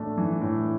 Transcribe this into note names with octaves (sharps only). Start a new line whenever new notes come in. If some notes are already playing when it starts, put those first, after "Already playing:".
Already playing: A2 E3 A3 D4
E3
A2